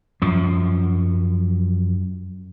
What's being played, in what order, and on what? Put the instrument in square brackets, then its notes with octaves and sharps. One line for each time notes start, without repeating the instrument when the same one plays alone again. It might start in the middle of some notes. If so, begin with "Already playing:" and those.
[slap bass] F#2 F3